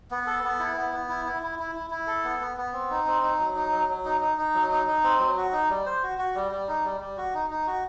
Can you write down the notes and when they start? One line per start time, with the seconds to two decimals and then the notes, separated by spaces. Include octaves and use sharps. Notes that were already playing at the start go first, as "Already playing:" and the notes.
0.11 B3
0.27 A4
0.44 B3
0.59 E4
0.77 B3
0.92 B3
1.09 E4
1.25 E4
1.43 E4
1.59 E4
1.75 E4
1.91 E4
2.07 A4
2.24 B3
2.41 B3
2.57 B3
2.73 C4
2.90 D#4
3.06 C4
3.22 D#4
3.39 F#3
3.56 D#4
3.72 F#3
3.89 F#3
4.05 D#4
4.21 D#4
4.38 D#4
4.54 F#3
4.71 D#4
4.87 D#4
5.03 C4
5.19 F#3
5.37 F#4
5.52 D#4
5.69 G3
5.86 C5
6.03 F#4
6.18 F#4
6.35 G3
6.51 G3
6.68 D#4
6.84 G3
7.00 G3
7.17 F#4
7.34 D#4
7.50 D#4
7.67 F#4